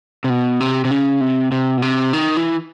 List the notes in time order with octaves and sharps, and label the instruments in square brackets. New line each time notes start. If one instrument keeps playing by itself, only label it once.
[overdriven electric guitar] C3
B2
C3
C3
C#3
C3
C3
B2
C3
D#3
E3